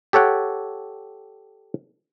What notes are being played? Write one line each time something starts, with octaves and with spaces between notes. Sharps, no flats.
G4 A4 C#5 F#5 G5